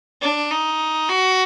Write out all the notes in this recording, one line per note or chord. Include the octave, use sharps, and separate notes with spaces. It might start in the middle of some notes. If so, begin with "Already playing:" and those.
D4
D#4
F#4